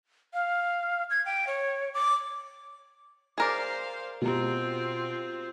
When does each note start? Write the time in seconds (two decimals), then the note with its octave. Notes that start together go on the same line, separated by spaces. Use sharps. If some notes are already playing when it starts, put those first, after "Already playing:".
0.34 F5
1.10 G#6
1.26 G5
1.47 C#5
1.94 D6
3.38 G#4 A#4 C5 D5 F5
4.21 B2 C4 F4 G4 A#5